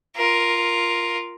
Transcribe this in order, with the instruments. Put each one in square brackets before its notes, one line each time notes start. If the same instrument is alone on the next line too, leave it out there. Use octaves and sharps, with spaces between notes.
[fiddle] F4 A#4